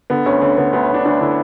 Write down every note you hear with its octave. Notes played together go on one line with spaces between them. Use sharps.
D3 B3
D2 C#4
D3 C#4
D3 B3
D2 B3
C#4
D2 D4
D2 D4
D3 E4